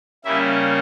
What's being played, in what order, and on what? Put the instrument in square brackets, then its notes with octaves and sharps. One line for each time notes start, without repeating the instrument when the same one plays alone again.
[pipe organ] C#3 G3 A#3 C#4 E4 E5